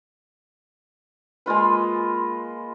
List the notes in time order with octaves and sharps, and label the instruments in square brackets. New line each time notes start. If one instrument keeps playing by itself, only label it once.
[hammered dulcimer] G#3 A#3 F4 B4